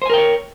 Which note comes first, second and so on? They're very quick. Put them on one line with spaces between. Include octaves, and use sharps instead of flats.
C5 G#5 A#4 G5 C#5